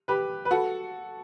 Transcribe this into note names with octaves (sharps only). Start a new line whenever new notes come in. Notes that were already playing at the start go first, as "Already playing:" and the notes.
G4 B4
B4
F#4 A4